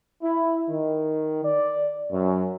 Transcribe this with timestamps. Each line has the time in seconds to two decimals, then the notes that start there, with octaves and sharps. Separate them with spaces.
0.22 E4
0.69 D#3
1.44 D5
2.12 F#2